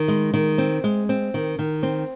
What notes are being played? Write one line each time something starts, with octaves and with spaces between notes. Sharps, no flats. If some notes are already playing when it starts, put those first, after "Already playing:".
Already playing: D#3
G#3
D#3
C4
G#3
C4
D#3
D#3
C4